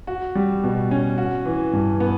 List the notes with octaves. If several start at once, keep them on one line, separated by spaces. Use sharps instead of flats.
F#4
G3
B2
C#4
F#4
E3
G2
B3